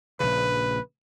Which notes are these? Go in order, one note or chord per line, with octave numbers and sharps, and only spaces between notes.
A#1 C#3 B4